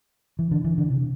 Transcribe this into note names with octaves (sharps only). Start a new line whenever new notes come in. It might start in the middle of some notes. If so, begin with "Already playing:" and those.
E3
D3
E3
D3
C3